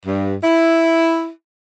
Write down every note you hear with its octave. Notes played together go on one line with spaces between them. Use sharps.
G2
E4